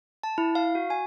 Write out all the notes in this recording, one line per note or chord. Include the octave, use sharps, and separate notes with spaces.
A5
E4
F5
F#4
G#5